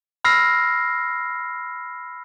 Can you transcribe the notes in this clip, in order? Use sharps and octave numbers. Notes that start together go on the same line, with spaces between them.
B5 E6 F6 A#6 C7